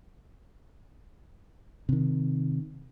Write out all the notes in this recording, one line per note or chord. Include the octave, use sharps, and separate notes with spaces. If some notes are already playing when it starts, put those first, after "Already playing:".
C3 D#3